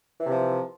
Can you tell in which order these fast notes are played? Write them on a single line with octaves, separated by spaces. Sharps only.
E3 C3 F3